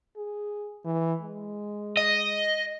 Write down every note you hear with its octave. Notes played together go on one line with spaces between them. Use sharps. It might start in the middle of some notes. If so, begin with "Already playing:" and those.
G#4
E3
G#3
D#5